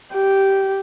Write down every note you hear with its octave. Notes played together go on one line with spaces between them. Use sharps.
G4